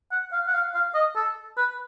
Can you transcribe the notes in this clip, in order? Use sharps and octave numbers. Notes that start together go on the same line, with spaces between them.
F#5
F5
F#5
F5
F5
D#5
A4
B4